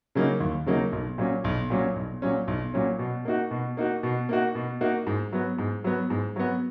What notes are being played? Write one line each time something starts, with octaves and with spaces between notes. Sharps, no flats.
C#3 F#3 A#3 D#4
D#2
C#3 F#3 A#3 D#4
B1
A#2 F#3 C#4
B1
A#2 F#3 C#4
B1
A#2 F#3 C#4
B1
A#2 F#3 C#4
B2
A#3 D#4 F#4
B2
A#3 D#4 F#4
B2
A#3 D#4 F#4
B2
A#3 D#4 F#4
G#2
F#3 B3
G#2
F#3 B3
G#2
F#3 B3